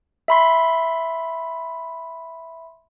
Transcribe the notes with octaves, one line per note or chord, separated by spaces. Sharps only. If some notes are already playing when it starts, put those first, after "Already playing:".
E5 B5 C6